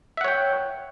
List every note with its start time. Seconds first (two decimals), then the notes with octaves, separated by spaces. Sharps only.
0.17 E5
0.21 F#5
0.24 C#5
0.28 G5